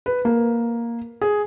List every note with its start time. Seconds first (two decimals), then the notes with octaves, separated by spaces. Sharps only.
0.06 B4
0.25 A#3
1.21 G#4